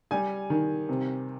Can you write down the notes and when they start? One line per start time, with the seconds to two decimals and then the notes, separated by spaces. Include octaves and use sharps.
0.11 G3 G#5
0.50 D#3
0.89 C3